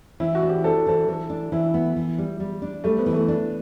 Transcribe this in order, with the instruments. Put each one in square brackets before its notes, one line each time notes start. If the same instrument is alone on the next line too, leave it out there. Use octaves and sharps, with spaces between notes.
[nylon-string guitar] E3 [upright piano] E4
[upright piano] F#4
[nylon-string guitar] D4
[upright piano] G4
[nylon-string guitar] D4 [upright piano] A4
[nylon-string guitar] E3 [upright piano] A4
[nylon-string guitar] E3 [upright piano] A4
[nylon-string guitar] D4
[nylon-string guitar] E3 [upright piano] E4
[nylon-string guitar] B3
E3
G3
G3
D4
[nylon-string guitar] G3 [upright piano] A3
[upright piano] B3
[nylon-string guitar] E3
[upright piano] A3
[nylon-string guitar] D4